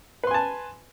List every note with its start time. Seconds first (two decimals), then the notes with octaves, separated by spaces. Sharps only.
0.24 B4
0.27 C6
0.31 G#5
0.34 A5